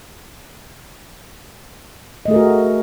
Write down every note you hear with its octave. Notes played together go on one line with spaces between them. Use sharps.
A3 F#4 G#4 A#4 D#5